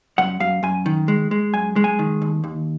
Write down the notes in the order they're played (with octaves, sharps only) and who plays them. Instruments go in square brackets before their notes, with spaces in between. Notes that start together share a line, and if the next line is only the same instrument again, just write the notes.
[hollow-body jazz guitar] F#2 F#5
F#2 F5
F#2 G#5
D#3
G#3
G#3
F#2 G#5
G#3
G#5
D#3
D#2
D#2